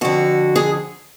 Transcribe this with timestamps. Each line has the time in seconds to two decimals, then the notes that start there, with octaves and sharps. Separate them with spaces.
0.01 F2 D3 F#4
0.56 G#4